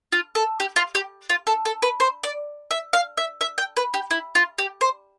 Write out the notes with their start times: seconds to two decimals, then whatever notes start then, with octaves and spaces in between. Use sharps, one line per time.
0.12 F4
0.35 A4
0.60 G4
0.76 F4
0.95 G4
1.30 F4
1.47 A4
1.65 A4
1.82 B4
2.00 C5
2.23 D5
2.71 E5
2.93 F5
3.17 E5
3.41 E5
3.58 G5
3.77 B4
3.94 G4
4.11 E4
4.35 F4
4.58 G4
4.81 C5